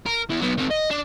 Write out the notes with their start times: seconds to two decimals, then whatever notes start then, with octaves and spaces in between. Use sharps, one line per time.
0.06 A#4
0.30 E3 B3
0.42 F#3 B3
0.58 D#3 C4
0.71 D#5
0.91 D4